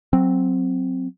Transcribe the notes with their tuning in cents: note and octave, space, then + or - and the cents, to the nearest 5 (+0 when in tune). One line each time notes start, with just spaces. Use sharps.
F#3 +0 C4 +0